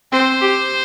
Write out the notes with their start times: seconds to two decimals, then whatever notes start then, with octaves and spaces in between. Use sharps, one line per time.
0.12 C4 C5
0.41 G4